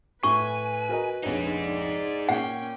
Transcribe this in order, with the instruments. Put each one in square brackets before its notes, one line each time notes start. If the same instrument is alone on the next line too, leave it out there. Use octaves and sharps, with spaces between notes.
[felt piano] A2 [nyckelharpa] B4 [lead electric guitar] G#5 [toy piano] C#6
[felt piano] F#4 A#4 D#5
[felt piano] F1 A#1 C#5 [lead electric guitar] D#4 G#4
[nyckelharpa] D5
[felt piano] A#2 [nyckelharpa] C#4 G5 [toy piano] F#5